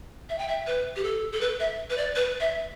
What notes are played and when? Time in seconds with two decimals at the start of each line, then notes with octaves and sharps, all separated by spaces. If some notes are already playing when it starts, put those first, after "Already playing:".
0.29 E5
0.38 G5
0.48 E5
0.67 B4
0.96 G4
1.04 A4
1.33 A4
1.41 B4
1.60 E5
1.90 B4
1.98 D5
2.15 B4
2.40 E5